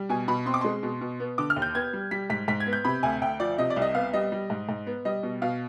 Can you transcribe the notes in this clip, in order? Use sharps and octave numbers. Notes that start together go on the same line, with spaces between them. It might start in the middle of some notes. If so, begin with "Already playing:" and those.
Already playing: G3
B2 G#5
B2 B5
C4 C6
D6
G#3 C6
B2
B2
B3
D3 D6
F6
D#2
G6
B3 G#6
G3
G3 B6
G#2 B6
G#2 B6
G#6
B3
G6
C3 B5
D2 G#5
D2 G5
F3 D5
C3 D#5
D5
C2
D#5
B3 F5
G3 D#5
G3
G#2
G#2
B3
G3 D#5
B2
B2 F5